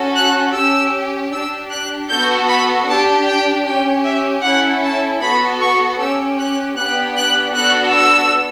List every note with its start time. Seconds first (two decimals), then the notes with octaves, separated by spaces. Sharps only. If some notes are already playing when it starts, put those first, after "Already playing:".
Already playing: C#4 F#4 A4
0.16 F#6
0.55 C#4 G4 E6
1.33 D4 G4 E6
1.71 F#6
2.11 B3 F#4 A4 G6
2.49 B5
2.88 D4 G4 A5
3.28 G5
3.66 C#4 G4 G5
4.06 E5
4.44 C#4 E4 A4 F#5
4.83 A5
5.22 B3 F#4 A4 B5
5.61 C#6
6.00 C#4 G4 E6
6.39 F#6
6.77 B3 D4 G4 F#6
7.17 F#6
7.56 B3 D4 F#4 A4 F#6
7.95 E6